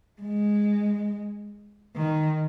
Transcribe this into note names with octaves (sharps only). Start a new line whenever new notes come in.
G#3
D#3